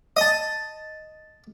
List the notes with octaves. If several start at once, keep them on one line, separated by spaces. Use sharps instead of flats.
D#5 A5